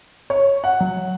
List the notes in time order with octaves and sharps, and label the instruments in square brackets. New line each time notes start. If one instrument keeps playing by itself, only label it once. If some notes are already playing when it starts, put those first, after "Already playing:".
[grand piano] C#5
F#5
[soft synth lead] F#3